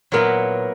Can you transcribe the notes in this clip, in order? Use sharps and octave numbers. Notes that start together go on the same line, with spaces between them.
A#2 F#3 B3 E4 A#4